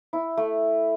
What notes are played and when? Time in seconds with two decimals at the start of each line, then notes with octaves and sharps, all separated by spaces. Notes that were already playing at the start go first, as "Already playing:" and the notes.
0.13 E4
0.37 A3